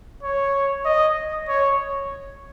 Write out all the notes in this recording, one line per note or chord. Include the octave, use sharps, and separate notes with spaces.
C#5
D#5
C#5